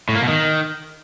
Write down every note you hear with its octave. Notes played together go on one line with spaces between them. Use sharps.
A2
A#3
B2
D#3